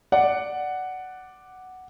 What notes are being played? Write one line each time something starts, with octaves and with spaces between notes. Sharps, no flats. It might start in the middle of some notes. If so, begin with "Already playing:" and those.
D5 F#5